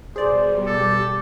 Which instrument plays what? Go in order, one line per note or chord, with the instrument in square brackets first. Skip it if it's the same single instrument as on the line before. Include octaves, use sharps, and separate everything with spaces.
[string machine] B2 G3 [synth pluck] G#4 D5 [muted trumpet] C5
[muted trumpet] G4 [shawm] A4